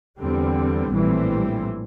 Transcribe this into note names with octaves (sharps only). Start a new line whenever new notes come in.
E2 D3 G3 C4
A#1 A2 E3 G3 C4